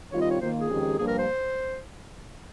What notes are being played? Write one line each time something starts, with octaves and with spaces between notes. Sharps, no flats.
D#3 G3 C4 F4 C#5
D#5
C#5
D#3 A#3 F4 C5
G#4
F2 D#3 G#3 C#4 G4
G2 F3 A#3 G#4
A#4
C5